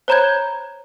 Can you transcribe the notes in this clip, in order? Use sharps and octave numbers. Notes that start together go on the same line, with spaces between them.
C5 C#5 A#5 B5 G6 G#6